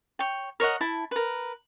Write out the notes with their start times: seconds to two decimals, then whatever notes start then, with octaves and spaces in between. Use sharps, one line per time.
0.19 C#5 G5
0.60 A#4 C#5 D#5 F#5
0.81 E4 A5
1.11 A#4 B4